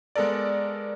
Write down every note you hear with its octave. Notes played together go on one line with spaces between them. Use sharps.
G#3 B3 A4 A#4 D5